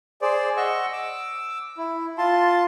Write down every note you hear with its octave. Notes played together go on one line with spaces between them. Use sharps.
G#4 C5 D5
D#5 F#5 C#6 E6
D6 E6
E4
F4 A5 C6